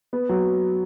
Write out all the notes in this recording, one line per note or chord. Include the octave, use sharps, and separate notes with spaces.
B3
F#3